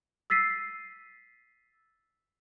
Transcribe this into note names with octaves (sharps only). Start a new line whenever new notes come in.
E6 A6 B6 C7 D#7